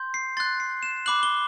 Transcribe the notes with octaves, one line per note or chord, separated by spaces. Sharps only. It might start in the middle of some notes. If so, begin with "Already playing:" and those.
Already playing: C6 G6
C7
C6 F#6 A6
C7
E7
B5 D6 F#6 F#7
G7